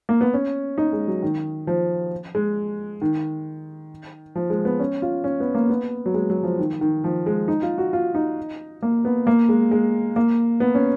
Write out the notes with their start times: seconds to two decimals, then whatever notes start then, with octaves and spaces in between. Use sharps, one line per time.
0.09 A#3
0.21 B3
0.34 C#4
0.78 D#4
0.93 G#3
1.07 F#3
1.23 D#3
1.67 F3
2.35 G#3
3.02 D#3
4.35 F3
4.50 G#3
4.65 B3
4.79 C#4
5.02 F4
5.24 C#4
5.40 B3
5.55 A#3
5.70 B3
6.06 F#3
6.14 G#3
6.30 F#3
6.43 F3
6.59 D#3
6.81 D#3
7.04 F3
7.26 G#3
7.48 D#4
7.62 F4
7.78 F#4
7.93 F4
8.15 D#4
8.83 A#3
9.05 B3
9.27 A#3
9.49 G#3
9.71 G#3
10.16 A#3
10.60 B3
10.75 C#4